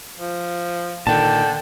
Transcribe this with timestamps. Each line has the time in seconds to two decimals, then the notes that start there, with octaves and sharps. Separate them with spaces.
0.19 F3
1.07 A#2 D3 D#3 G5 A5